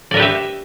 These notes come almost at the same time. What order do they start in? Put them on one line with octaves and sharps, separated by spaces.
D5 A#4 B4 G4 E5